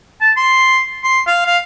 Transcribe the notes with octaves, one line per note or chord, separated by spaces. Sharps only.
A5
C6
C6
F5
F5